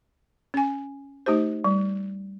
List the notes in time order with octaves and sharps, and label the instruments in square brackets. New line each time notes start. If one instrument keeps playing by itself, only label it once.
[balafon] C#4 G#5
A3 D#4 G4 C5
G3